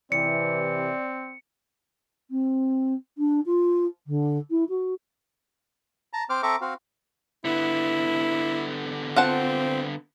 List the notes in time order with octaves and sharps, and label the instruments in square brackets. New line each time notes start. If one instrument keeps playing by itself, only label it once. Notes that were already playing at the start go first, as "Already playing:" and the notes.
[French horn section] C3 E3 [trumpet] C4 [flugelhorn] D5 [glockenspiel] C#7
[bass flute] C4
D4
F4
D3
E4
F#4
[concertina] A5 A#5
C4 C5 D6 F6
C4 A4 E5 A#5 C#6 D6
C4 F#4 F5
[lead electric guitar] D3 B3 [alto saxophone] E4
[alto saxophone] C4 [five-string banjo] F4 F#5 A5